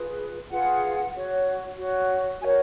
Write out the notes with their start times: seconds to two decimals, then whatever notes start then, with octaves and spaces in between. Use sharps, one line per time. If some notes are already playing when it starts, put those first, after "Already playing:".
Already playing: F4 G#4 B4
0.49 F4 G#4 B4 F#5
1.14 F#4 C#5
1.77 F#4 C#5
2.41 F#4 A#4 C#5 G#5